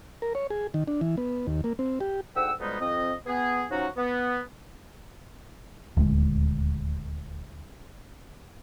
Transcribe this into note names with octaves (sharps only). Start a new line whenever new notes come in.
A#4
C#5
G#4
D#3
D4
E3
B3
D#2
A#3
C4
G4
D2 G#2 F#5 G5 E6
F2 B2 G3 G#3 B3 D#4
F2 C4 D#5
B3 G#4
F3 F#3 C#4 D#4 F#4
B3
D#1 D2 G3 G#3